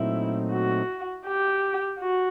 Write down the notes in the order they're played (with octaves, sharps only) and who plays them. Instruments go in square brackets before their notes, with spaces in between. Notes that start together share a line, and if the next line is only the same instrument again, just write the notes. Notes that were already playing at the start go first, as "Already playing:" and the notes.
Already playing: [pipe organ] A#2 F#3 A3 C4 D#4 [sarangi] E4
[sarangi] F#4
G4
F#4